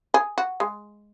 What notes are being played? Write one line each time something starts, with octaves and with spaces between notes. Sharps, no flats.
G#4
F#4
G#3